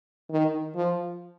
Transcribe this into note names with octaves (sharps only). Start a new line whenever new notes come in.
D#3
F3